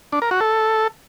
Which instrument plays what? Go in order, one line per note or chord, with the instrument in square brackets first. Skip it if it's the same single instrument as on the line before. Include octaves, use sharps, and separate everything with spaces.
[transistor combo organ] D4
A#4
F#4
A4